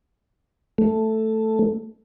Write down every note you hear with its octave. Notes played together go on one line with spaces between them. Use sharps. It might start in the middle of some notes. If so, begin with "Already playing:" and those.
A3